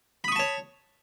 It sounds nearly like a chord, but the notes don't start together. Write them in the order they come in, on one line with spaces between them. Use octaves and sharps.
B5 D#6 C#6 A5 C#5